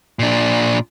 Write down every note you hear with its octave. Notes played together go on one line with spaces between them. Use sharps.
A#2 D4